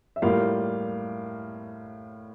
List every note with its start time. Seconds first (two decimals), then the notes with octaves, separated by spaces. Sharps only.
0.16 E5
0.22 A2 G3 A#3 F4 F5